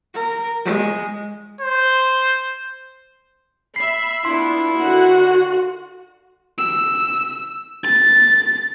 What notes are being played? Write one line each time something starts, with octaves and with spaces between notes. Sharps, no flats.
A#4
G#3
C5
E5 B5 C7
B3 D4 E4 F4 C6
D3 D#3 F#4 F#5
E6
A6